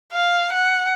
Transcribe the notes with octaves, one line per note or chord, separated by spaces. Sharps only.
F5
F#5